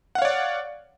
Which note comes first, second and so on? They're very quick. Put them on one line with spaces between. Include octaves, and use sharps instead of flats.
F#5 F5 C#5 D5